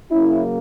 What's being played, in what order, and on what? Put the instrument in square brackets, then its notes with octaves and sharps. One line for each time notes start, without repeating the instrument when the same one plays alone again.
[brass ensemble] C#3 F#3 A#3 C#4 E4